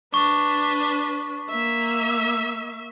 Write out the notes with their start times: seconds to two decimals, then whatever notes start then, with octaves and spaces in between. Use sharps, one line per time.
0.14 D4 B4 C#6
1.49 A#3 E5